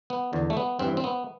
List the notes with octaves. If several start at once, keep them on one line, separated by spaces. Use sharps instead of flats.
B3
E2 D3
A3
B3
G2 E3 C4
C4
B3